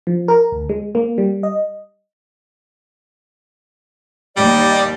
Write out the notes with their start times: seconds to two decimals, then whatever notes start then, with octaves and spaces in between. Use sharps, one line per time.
0.07 F3
0.28 A#4
0.52 D2
0.69 G#3
0.95 A#3
1.18 G3
1.43 D#5
4.37 D#2 G3 D5 D#5